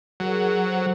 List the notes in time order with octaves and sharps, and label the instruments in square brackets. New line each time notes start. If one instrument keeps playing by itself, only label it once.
[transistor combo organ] F#3 [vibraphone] G#4 A#4 C#5
[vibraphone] A4 C5